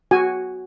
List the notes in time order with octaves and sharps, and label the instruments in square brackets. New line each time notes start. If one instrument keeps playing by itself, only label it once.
[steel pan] F#4 G#5